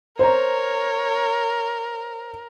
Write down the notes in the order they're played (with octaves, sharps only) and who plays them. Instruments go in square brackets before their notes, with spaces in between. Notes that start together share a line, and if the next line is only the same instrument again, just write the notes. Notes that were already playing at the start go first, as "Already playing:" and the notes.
[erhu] A#4 [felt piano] C5 A#5 [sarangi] C#5